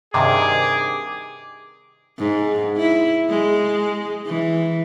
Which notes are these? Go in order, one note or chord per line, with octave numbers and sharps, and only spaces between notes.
G2 C3 D#3 G#4 D6
G#2
E4
G#3
E3